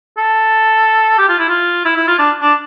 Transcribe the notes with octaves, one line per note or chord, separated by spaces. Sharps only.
A4
G4
F4
E4
F4
E4
E4
F4
D4
D4